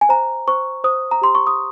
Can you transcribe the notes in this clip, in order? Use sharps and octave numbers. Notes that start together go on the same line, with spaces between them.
G#5
C5 A#5
C5 C#6
C5 D#6
A#5
G4 C6
C#6
D#6